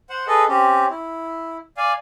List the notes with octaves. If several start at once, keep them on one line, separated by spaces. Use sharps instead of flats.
C5 F#5
G#4 A4 B4 D#5
C4 C#4 G4
E4
D5 F5 G#5